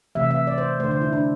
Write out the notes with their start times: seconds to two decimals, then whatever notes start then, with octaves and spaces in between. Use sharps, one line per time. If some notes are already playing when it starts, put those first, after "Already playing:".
0.15 C3 E3 A3 E5
0.31 E5
0.47 D5
0.58 C5
0.79 A3 C5
0.84 D3
0.91 C5
1.02 E4
1.13 D4